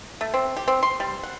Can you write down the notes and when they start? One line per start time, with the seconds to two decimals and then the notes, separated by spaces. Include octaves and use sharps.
0.21 A3
0.34 C4
0.56 G4
0.68 C4
0.83 C6
1.00 G3
1.23 F#5